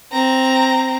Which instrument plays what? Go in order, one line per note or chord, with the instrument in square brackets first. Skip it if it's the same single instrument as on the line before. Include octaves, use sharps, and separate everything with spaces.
[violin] C4 A#5